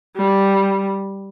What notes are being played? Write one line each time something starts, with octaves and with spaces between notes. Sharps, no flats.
G3